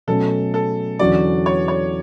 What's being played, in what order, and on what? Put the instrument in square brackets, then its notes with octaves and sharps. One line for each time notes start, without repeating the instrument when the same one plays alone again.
[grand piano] B2 F#3 A3 C#4 [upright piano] A4
[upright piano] A4
[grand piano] E2 D3 F#3 C#4 F#4 [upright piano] D5
[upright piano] C#5
C#5